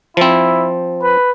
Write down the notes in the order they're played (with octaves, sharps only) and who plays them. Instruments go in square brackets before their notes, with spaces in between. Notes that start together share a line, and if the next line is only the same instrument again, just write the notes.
[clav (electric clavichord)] F3 C4 [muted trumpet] E4
[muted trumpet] B4